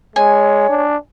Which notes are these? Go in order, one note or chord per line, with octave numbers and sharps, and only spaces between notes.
G#3 C#5 G#5
D4